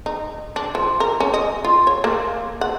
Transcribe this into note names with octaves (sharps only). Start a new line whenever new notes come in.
D#4
D4
F3
A#4
C#4
D#5
F4
C#5
A#3
F#5